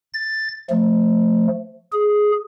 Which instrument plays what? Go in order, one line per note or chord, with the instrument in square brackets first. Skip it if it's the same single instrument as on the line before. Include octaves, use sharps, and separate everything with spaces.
[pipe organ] A6
F3 A3
G#4